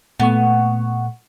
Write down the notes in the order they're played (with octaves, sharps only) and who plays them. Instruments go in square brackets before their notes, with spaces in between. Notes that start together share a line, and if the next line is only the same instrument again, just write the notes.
[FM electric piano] A#2 A3 C#6 [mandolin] B3